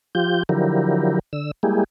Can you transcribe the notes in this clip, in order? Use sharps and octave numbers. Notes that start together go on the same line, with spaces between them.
F3 F4 G4 G6
D3 F3 F#3 E4 G4 A#4
D3 E6
G3 G#3 A#3 E4 G4 G#4